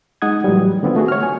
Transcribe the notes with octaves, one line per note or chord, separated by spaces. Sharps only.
G#3 D#4 F#5 D#6 G#6
A2 E3 F#3 G3
D3 B3 C4 F4
A3 F#4 G#4
C#5 F6
G#5